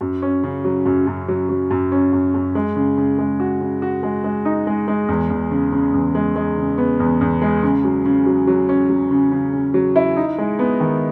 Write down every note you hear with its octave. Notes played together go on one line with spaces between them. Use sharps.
F#2
C#4
C#3
F#3
F#2
F#2
F#3
F#3
F#2
C#4
F#2
F#2
G#3
C#3
C#3
G#3
F#4
C#3
F#4
G#3
G#3
D#4
G#3
G#3
E2
E2
C#3
C#3
E2
G#3
G#3
C#3
B3
E2
E2
G#3
C#3
F#3
C#3
F#3
F#3
C#4
F#3
C#3
C#3
C#3
F#3
E4
D#4
G#3
B3
D#3